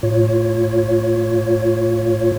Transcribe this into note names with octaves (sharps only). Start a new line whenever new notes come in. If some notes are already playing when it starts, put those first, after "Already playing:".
A2 F4 C#5